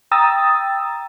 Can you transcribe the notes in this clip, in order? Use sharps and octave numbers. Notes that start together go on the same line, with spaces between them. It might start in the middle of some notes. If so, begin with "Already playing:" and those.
G5 A#5 D#6 E6 A6